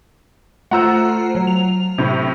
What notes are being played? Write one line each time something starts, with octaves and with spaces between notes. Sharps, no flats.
A3 F4 C5 F#5 A#5 E6
F#3
F7
A2 C3